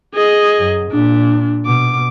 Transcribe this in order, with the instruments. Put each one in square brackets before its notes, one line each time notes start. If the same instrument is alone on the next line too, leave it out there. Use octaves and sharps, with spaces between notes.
[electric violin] G#4 D#5
[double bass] F#2
[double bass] A#2 [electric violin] D4
[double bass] B2 [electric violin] D6